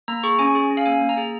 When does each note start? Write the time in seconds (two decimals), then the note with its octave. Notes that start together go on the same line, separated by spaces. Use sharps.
0.08 A#3 A#5
0.23 G#4 C#6
0.39 C#4 G#5
0.55 G#4
0.71 C#4
0.77 F5
0.86 A#3 G#5
1.01 A#3
1.09 A#5
1.17 G#4